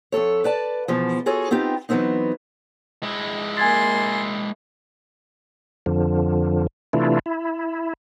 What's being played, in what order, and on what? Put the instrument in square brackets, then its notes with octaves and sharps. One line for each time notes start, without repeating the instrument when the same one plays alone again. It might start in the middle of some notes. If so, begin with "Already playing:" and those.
[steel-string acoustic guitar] F2 G#2 A4 C#5
B4 D5 A5
E2 B2 F3
F4 F#4 G#4 A4 C#5
B3 C4 D#4 F4 G4
E3 F#3 G#3 B3 C4 D#4
[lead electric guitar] G#3 E4
[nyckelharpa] A#3 C6 [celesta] G#5 G#6 A6
[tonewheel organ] F2 D3 F3
C3 E3 A3 D4 E4 F4
E4